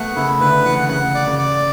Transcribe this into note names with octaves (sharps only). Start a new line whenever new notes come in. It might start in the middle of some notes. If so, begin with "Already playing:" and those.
Already playing: A3 B3 F#5
C#3 E4
D3 B4
E3 F#5
C#3 F#5
D5
C#3
D5